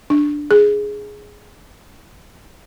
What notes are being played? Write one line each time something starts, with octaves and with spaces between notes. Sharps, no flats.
D4
G#4